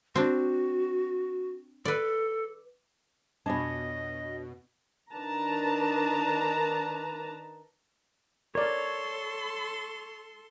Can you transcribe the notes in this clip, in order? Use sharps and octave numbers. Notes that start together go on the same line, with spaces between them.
C4 D4 F#4
A4 B4 D5
F2 B2 D4 C#5 D#5 G#5 B5
D#3 D4 A#4 B4 A5 A#5
A4 A#4 C#5 D5 C6